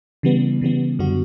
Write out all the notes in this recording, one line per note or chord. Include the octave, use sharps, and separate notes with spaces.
C#3 E3 G3 B3
C#3 E3 G3 B3
F#2 D3 G3 B3 F#4